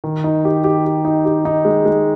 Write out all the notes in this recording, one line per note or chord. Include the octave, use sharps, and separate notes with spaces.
D#3
D#4
G4
G4
G4
D#4
G4
D#4
G#3
G#3